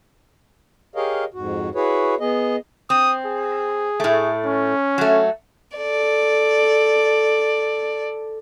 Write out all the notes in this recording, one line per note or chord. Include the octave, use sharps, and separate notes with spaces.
G4 G#4 A#4 C#5 D#5 F5
F2 G#2 F#4
E4 F#4 G#4 B4 C#5
B3 G#4 D#5
C4 D#6
G#4
A2 A3
C#4
F#3 A3
A4 D5